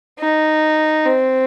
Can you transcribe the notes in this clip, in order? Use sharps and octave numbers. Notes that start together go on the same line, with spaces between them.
D#4
C4